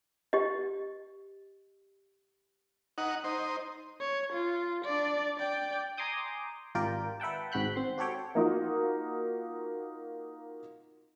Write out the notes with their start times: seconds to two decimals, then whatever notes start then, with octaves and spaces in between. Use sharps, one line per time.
0.33 G4 D#5
2.98 D#4 F#5
3.24 D#4 C5
4.00 C#5
4.32 F4
4.85 D4 D5
5.38 D5 G5
5.97 G#5 A#5 C6 D6 D#6 G6
6.75 G#1 F4 G4 A#4 D5 G5
7.20 B4 E5 F#5 G5 A5
7.52 G#1 G#2 F#4 B5 F#6 G6
7.76 C4 C6
7.98 F#4 G4 A4 C#5 G5
8.35 A#3 D#4 F4 F#4